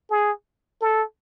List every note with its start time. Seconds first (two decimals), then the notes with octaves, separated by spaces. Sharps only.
0.11 G#4
0.82 A4